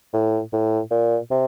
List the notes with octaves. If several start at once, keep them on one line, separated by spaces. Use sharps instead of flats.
A2
A2
A#2
C3